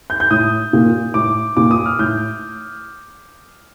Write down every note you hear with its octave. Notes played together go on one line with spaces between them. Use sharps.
G6
G6
A2 D#6
A#2
A2 D6
A#2 D6
D#6
F6
A2 G6